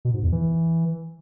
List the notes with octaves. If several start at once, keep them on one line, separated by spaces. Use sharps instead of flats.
B2
G#2
E2
E3